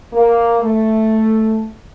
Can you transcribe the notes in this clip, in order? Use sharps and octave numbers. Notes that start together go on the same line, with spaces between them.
A#3
A3